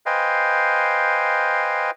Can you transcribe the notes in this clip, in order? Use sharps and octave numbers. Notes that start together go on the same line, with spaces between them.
B4 C5 D#5 F5 G5 G#5